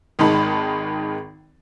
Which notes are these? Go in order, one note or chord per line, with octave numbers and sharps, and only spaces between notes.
G#1 D#3 G#3 D#4 A5 B5